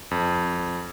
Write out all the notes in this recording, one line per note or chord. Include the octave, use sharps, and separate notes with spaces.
F2